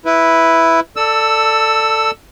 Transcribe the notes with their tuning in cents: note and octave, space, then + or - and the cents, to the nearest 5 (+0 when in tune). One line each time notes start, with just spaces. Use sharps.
E4 +0 B4 +0
A4 +15 D5 +10 E6 +0